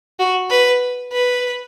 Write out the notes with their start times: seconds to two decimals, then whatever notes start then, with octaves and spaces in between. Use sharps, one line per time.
0.19 F#4
0.50 B4
1.12 B4